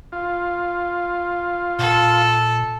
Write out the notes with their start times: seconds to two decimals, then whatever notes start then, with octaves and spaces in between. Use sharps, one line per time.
0.12 F4
1.79 A#2 A4